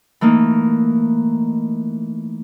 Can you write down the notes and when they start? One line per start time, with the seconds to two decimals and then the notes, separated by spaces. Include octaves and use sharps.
0.21 E3 A3 A#3 D#4